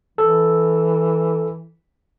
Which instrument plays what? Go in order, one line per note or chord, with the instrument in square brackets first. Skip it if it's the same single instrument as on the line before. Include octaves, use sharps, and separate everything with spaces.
[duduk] E3 [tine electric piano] A4